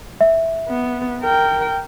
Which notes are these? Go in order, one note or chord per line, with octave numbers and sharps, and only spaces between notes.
E5
B3
A#4 G5